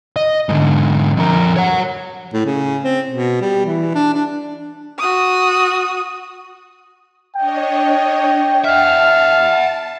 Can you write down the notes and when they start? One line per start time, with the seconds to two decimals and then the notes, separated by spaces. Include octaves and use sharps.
0.16 D#5
0.49 G#2 D3
1.17 F2 A#4
1.57 C#5 F#5
2.33 A2
2.46 C#3
2.84 C4
3.11 B2
3.42 G3
3.66 E3
3.95 D4
4.14 D4
4.98 F#4 D#6
7.36 D4 C#5 D#5 G5
8.64 E5 F#5 A5 F6